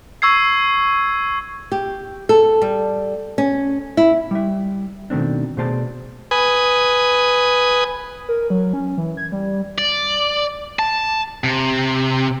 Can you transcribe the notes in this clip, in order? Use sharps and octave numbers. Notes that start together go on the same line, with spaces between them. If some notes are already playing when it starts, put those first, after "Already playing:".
C#6 E6 G#6 C7
G4
A4
G3
C#4
E4
G3 E5
B2 D#3 A3 C4 D4
B2 A3 G#4 C5 D5 A5
B4 G#5 D#6
A#4
F#3
C#4
E3
G#6
G3
D5
A5
C3